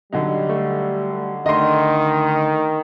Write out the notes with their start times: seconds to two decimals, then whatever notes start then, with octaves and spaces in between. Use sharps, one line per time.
0.13 D3 F#3 G3 D#4
0.49 A3
1.46 D3 D#3 A3 D#5 C6